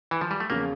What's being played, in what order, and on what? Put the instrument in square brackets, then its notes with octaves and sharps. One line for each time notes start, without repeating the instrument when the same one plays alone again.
[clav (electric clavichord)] E3
F3
G3
A3
[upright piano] E2 C#3 F3 C#4 F4 [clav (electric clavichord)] A#3